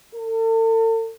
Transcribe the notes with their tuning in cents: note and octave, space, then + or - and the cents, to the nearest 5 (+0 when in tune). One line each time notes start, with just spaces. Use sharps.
A4 +40